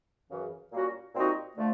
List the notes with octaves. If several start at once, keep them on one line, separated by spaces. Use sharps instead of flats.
F#2 C#3 E3
A#2 G3 A#3 C#4 F#4
A#2 G3 C4 D#4 F#4
D3 F3 A3